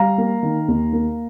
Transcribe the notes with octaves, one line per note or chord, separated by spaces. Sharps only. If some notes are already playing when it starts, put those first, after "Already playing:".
Already playing: G3 F5 A#5
A#3
D#3
D#2
A#3